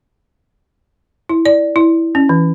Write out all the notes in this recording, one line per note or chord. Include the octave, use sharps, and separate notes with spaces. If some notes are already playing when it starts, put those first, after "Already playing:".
E4
D5
E4
C#4
E3